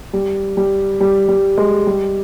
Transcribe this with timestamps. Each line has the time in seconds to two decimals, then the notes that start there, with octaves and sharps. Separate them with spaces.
0.13 G3
0.57 G3
1.01 G3
1.28 G3
1.58 G#3
1.87 G3